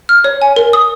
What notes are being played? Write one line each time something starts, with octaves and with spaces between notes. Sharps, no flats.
F6
C#5
G#5
A#4
D#6